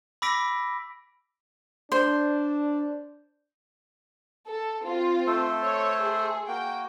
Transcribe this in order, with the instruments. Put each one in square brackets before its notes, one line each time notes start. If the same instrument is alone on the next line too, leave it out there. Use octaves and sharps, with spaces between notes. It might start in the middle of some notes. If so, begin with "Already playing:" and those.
[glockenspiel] B5 D6 E6 A#6 B6 D7
[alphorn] D4 [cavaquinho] C5
[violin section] A4
C4 F4
[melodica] A3 A4 C5
[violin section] C#5
G#4
[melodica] A#3 F#4 [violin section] G5